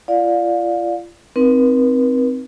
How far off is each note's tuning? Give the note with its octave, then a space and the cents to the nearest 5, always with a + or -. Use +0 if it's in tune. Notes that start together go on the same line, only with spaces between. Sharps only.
F4 -35 D5 +0 F5 +25
C4 +0 D#4 +0 B4 -45